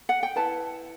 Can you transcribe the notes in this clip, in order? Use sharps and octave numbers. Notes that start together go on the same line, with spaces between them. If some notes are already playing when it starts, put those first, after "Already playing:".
F#5
G5
E4 B4 A5